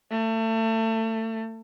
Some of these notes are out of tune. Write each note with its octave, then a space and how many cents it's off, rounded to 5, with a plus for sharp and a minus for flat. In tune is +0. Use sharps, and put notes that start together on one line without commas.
A3 +30